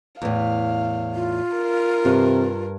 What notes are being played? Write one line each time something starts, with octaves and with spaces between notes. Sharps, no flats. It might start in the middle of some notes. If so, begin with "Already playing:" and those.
E2 A2 F5
F4
A#4
G2 C3